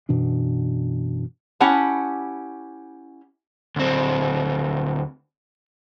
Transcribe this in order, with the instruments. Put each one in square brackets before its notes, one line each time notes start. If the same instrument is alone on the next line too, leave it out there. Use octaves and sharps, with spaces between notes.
[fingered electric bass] F#2 B2 E3 D4
[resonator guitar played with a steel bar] C#4 E4 G4 F#5 A5
[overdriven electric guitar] D2 C4